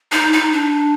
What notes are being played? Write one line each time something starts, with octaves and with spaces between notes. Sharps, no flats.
D#4
D#4
D4